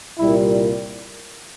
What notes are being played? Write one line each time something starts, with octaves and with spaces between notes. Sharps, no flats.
C2 A#2 G3 A#3 E4